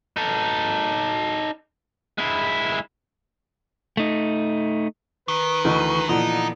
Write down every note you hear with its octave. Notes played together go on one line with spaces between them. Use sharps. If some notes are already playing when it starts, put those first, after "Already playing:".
D#4 A4
G#3 E4
A3 D#4
D#3 B4
D2 E3 D#5
A#2 D3 E3 F3 B3 D#4